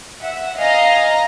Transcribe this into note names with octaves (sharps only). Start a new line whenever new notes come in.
E5 F#5
D#5 F5 G#5 A#5